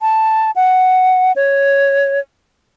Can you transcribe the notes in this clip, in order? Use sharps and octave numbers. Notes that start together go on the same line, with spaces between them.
A5
F#5
C#5